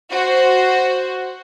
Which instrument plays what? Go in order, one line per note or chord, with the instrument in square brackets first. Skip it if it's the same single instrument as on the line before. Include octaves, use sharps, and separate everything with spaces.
[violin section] F#4 C5